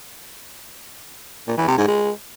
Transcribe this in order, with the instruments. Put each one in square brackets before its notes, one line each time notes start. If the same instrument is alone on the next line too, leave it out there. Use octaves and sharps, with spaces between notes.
[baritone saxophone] A#2
E3
C3
G#2
G#3